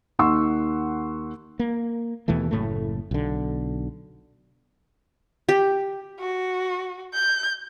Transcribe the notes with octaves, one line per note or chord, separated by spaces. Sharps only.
D#2 D#4 F#5 C6 C#6 E6
A#3
D#2 B2 E3 A3
F#1 A2 A3
B1 D3
G4
F#4
G6